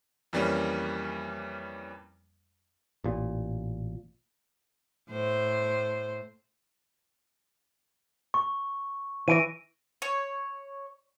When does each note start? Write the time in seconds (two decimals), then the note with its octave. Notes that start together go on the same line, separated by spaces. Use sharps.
0.33 F2 E3 G3 A#3 C#4
3.04 A1 A#2
5.10 A2 C5
8.34 C#6
9.28 E3 A#6 D7 D#7
10.02 C#5